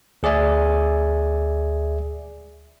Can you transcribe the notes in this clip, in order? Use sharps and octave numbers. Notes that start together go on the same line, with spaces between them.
D2 G#4 D5 E5 G#5